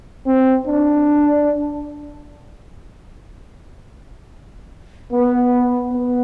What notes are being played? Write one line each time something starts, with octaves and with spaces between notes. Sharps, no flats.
C4
D4
B3
B3